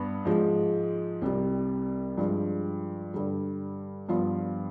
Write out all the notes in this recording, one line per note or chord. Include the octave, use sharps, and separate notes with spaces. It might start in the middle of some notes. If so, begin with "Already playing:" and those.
Already playing: G2 B3 D4
G#2 F3 G#3
C2 C3 G3
G2 F3 G#3
G2 D3 G3
G2 F3 B3 D4 F4